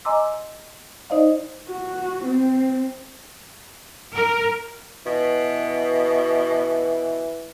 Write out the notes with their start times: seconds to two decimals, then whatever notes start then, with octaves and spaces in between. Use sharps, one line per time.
0.05 D#5 G#5 A#5 C6 D6 E6
1.10 D#4 C5 D5 D#5 F5
1.68 F#4
2.24 C4
4.15 A#4
5.06 B2 E3